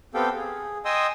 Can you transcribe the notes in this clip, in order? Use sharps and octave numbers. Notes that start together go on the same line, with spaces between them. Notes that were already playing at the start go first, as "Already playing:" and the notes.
B3 C4 G4 A4 F5 G5
G#4
D#5 G5 G#5 C6 D#6 E6